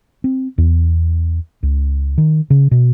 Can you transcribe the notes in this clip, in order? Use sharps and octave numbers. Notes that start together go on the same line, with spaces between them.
C4
E2
C#2
D#3
C#3
B2